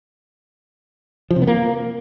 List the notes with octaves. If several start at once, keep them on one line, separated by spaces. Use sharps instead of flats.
F3
C3
B3
A#3